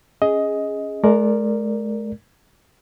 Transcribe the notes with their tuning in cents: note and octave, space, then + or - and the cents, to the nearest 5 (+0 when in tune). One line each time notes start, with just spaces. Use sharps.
C#4 +0 G#4 +0 D#5 +15
G#3 +45 A#4 +0 D5 +0